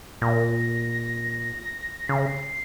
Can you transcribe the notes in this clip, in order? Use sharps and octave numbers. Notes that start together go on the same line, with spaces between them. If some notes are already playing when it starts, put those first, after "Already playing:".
A#2 A#6
C#3 C7
A#6
C7